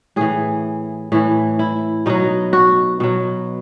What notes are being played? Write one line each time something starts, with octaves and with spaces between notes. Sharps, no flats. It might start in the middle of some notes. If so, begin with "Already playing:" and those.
A2 E3 G#4
A2 E3 E4
E4
B2 F#3 D#4
F#4
B2 F#3